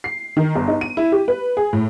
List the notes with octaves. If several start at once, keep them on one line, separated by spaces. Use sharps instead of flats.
C7
D#3
G1
D#4
D#7
E4
G4
B4
G#4
A2